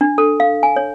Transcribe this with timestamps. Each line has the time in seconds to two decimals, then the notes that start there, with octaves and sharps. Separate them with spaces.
0.01 D4
0.18 A4
0.40 F5
0.63 G#5
0.76 C#5